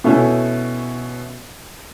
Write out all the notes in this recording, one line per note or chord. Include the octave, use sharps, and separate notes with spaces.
B2 A3 C#4 E4